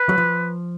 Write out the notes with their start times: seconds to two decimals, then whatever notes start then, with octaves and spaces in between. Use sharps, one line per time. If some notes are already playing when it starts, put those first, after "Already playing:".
Already playing: B4
0.09 F#3
0.18 F3